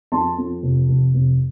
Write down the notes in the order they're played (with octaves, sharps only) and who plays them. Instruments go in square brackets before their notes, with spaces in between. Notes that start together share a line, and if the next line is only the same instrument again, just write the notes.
[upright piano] F2 A5 C6
F2
F1
F1
F1